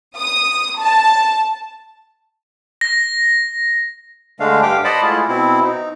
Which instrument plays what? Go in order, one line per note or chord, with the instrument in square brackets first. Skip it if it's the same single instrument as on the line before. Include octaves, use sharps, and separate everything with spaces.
[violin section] D#6
A5
[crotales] A#6
[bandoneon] D3 G#3 A3 D4 F5
G2 G4 F5 G5 D6
C5 D5 D#5 F#5 A5 B5
G#3 A3 E4 F4 G#4
B2 C4 E4
D#4